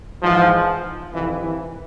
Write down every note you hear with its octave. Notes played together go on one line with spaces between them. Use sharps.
G#2 E3 F3
F2 C3 D#3 E3
E3